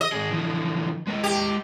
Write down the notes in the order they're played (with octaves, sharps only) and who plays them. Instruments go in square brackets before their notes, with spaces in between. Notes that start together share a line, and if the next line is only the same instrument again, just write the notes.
[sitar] D#5
[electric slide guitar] G#2 D#3 G#4
D3 E3 F3
G#3 B4 D#5
[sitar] G4